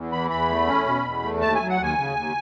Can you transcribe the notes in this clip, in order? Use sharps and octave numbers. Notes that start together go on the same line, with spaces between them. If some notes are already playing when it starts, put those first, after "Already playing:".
Already playing: E2
E3 B5
E2 B5
A3
C#4
B2
E2
A3
D#2 A5
G#5
F#3
F#5
D#2
G#5
C#3
D#2